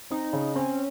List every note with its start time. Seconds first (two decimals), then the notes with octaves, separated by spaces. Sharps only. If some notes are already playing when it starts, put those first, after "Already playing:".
0.10 C4 D#4
0.33 C#3
0.55 C4 C#4